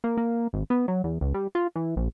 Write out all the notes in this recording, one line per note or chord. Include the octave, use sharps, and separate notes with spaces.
A#3
A#3
G#1
B3
F#3
E2
C#2
G3
F4
E3
A#1